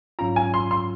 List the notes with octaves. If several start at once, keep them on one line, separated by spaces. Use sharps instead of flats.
G#2 F#3 C#4 F4 A#5
G#5
C6
C6